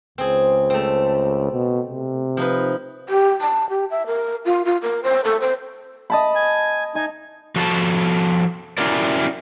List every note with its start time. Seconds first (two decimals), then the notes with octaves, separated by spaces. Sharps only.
0.18 C#2 C4 G#4
0.70 A3 C4
1.52 B2
1.88 C3
2.37 F3 D#4 B4
3.09 G4
3.41 A5
3.70 G4
3.91 E5
4.06 A#4
4.45 F4
4.65 F4
4.82 A#4
5.03 C5
5.25 A4
5.41 C5
6.10 D#5 A5 B5
6.35 G#5
6.95 D#4 D#5 G#5
7.56 F3 F#4 A4 F5 A5
8.78 C#4 E4 F#4 G4 A#4 D5